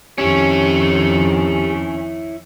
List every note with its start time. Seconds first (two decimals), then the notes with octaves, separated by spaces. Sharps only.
0.18 F2 D#3 C#4 E4 G4 C#5